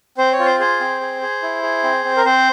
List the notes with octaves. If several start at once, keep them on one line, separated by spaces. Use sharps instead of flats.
C4 C5
C#5
F4
C5
G#4 C5
C4
G#4
G#4
E4
G#4
C4
C4
A#4
C4 C5